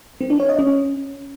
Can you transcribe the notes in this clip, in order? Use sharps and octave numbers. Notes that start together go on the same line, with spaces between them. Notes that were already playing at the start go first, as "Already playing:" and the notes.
C4
D4
C#5
D#5
C#4